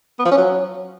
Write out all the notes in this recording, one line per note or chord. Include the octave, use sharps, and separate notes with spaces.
B3
F3
C#4
F#3